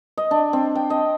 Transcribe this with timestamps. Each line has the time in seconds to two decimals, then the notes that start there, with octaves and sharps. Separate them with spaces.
0.18 D#5
0.31 D4
0.53 C4
0.75 G5
0.90 D#5